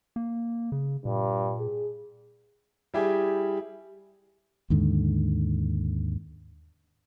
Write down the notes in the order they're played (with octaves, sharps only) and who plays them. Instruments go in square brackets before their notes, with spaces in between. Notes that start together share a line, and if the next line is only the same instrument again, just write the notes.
[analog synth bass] A#3
C#3
[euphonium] G2 [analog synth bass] A#2
[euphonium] G#4
[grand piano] G3 E4 G4 G#4
[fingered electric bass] D#2 G#2 D3